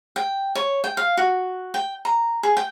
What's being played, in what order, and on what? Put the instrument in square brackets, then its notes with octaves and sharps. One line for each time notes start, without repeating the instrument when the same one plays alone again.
[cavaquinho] G5
C#5
G5
F5
F#4
G5
A#5
G#4
G5